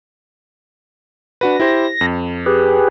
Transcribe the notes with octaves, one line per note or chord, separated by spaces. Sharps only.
D4 F#4 B4 A#6
E4 G4 C5
F2
G4 G#4 B4